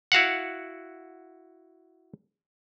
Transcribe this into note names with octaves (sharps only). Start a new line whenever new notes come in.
E4 F#4 F5 F#5